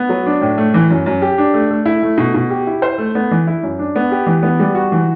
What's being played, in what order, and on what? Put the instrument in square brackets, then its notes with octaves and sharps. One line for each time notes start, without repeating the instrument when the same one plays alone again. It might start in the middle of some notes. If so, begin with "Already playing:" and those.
Already playing: [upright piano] B3
F#3
D4
A2
A3
E3
F#2
F#2
G4
D4
A3
A3
E4
A3
B2
B2
G4
E4
C5
A3
B3
E3
E4
F#2
D4
B3
G4
E3
B3
G3
F#4
E3